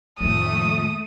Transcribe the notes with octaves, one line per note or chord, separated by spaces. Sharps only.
F2 A2 D#3 A3 D#6